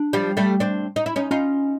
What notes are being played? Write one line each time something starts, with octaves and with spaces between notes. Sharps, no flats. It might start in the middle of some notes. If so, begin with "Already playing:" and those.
Already playing: D4
F3 G3
G3 A3
C4 D4
D#4
E4
C#4 D#4
C#4 D#4 F4